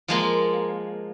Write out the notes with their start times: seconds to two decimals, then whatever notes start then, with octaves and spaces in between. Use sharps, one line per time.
0.08 F3 G#3 A#3